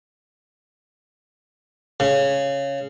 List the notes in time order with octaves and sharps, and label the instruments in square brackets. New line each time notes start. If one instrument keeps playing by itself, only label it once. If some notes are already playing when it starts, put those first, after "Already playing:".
[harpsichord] C#3